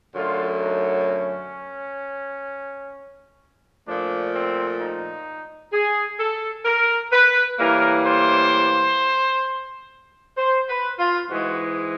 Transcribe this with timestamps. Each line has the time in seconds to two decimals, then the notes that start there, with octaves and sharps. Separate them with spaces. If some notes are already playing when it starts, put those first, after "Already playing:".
0.14 F#2 D3 F#3 A3 F4
0.61 D#4
1.08 C#4
3.86 A#2 F3 A3 D4
4.33 C4
4.79 D#4
5.73 G#4
6.19 A4
6.65 A#4
7.12 B4
7.58 A2 E3 G3 A#3 A#4
8.05 C5
10.37 C5
10.69 B4
10.99 F4
11.30 G#2 E3 G#3 F#4